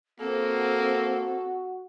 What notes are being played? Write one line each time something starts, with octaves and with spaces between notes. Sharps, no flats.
A#3 C4 F#4 A4